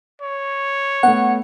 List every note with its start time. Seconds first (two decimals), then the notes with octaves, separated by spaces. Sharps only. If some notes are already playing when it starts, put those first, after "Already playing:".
0.22 C#5
1.03 A3 B3 F#5